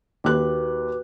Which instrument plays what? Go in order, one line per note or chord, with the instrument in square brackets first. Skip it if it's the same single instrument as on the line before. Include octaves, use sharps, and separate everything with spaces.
[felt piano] D#2 F#6 [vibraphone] F#4 B4 D6